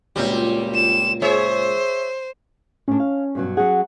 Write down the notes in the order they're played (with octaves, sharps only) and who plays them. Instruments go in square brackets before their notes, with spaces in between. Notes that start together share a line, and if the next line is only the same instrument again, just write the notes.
[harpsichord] C#2 A#2 F#4 [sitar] G3 C4
[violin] E7
[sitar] G#4 C#5 E5 [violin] C5
[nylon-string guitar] A2 D4 [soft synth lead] C#4
[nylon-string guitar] F5
G2 B2 F#3
[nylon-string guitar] F#3 C#4 G#4 [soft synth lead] F#5